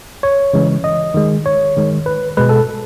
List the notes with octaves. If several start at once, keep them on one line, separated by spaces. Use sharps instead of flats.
C#5
C#3 E3 G#3
D#5
D#3 G#3
C#5
D#3 G#3
B4
B2 G#3 B4
A4